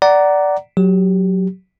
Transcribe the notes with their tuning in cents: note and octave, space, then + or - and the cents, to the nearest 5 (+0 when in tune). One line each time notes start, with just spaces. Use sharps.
D5 -5 F#5 +20 A#5 +0
F#3 +0 G4 +0